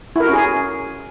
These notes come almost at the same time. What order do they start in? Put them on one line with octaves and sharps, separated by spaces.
E4 A#4 F#4 C#4 G#4